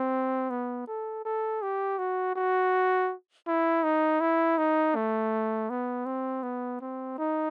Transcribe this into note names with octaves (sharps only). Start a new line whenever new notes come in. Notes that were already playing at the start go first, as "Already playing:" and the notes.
Already playing: C4
B3
A4
A4
G4
F#4
F#4
E4
D#4
E4
D#4
A3
B3
C4
B3
C4
D#4